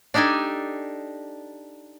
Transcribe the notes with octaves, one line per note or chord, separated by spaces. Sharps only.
D4 D#4 G4 A4 G#5